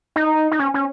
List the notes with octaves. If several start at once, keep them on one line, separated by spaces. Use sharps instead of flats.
D#4
D#4
C#4
C#4